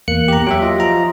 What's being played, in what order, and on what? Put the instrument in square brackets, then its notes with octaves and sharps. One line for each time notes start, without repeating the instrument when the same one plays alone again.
[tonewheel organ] E2 A#3 F#6 [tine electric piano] C#7
[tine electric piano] G4 A#5
[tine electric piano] F#3 G4 E5 [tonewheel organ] G5
[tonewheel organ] F4 D#5
[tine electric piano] F3 A#5